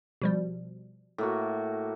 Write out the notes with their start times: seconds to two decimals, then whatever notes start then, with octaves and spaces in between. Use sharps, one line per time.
0.22 B2 F3 G3
1.18 A2 A#3 F#4